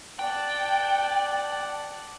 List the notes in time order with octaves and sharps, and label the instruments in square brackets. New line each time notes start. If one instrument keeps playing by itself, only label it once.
[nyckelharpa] D5 F#5 [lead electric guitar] G5 [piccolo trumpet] A5